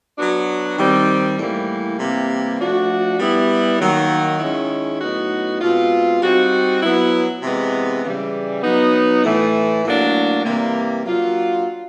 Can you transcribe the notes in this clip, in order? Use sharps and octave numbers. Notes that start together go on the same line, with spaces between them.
F#3 B3 D4 F#4
D#3 G3 C4
A2 E3 G3 A#3
C3 E3 G3 A#3
F3 A3 D4 F#4
G3 B3 E4
D#3 F#3 A#3
D#3 G#3 C#4 E4
A2 F#3 B3 D#4 F#4
B2 G#3 C4 F4
G3 C4 D#4 F#4
F#3 B3 E4
C3 E3 G#3 B3
C#3 E3 G3
F#3 B3 D#4
A2 E3 A3
A2 F#3 A#3 D4
C3 E3 G3 A#3
F#3 A#3 D4 F4